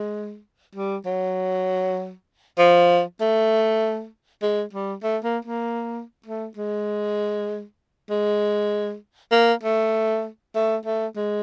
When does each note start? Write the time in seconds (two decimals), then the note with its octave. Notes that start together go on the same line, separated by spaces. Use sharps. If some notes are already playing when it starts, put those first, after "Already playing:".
Already playing: G#3
0.75 G3
1.06 F#3
2.59 F3
3.21 A3
4.42 G#3
4.73 G3
5.03 A3
5.24 A#3
5.45 A#3
6.26 A3
6.57 G#3
8.10 G#3
9.32 A#3
9.63 A3
10.55 A3
10.85 A3
11.16 G#3